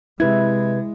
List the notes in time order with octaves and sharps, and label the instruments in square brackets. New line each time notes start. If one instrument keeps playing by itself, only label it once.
[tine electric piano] C3 B4 G#6 [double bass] G#3 [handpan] E4